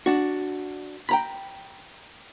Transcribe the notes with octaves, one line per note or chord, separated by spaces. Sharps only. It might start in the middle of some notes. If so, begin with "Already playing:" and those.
D4 F#4
G5 A#5 B5